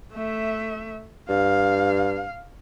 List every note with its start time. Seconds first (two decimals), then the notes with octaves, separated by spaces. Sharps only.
0.13 A3 E5
1.29 G2 F5